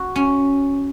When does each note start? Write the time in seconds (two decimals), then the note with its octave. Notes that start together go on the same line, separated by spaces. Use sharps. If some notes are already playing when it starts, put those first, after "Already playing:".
Already playing: F#4
0.16 C#4